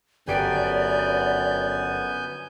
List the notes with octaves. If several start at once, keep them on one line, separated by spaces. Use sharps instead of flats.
G1 F#2 B3 G4 D5 G#5 G6 D7